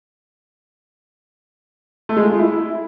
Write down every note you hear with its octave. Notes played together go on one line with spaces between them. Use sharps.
A3
G#3
F4
G#3
E4